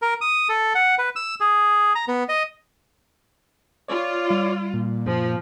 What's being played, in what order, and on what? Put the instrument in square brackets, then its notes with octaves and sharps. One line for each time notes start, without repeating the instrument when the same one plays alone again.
[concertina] A#4
D#6
A4
F#5
B4
E6
G#4
A#5
B3
D#5
[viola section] F4 [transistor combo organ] C#5 D5 [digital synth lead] C#6
[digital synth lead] G3
[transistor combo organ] A#2
[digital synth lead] F#2 [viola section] F3